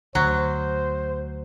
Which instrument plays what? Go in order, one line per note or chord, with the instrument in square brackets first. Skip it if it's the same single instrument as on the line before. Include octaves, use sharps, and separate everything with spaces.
[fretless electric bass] D2 [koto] F#3 [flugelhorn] C5